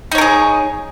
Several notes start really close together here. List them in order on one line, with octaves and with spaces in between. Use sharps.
D#4 C#5 A#4 G#4